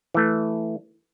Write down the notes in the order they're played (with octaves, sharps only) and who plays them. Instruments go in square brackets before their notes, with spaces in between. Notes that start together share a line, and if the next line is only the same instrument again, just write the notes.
[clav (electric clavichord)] E3 A3